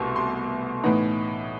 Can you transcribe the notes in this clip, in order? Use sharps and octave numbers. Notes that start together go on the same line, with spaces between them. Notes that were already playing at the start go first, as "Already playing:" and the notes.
Already playing: C2 B2 A3 C6
C6
A2 E3 B3 D#4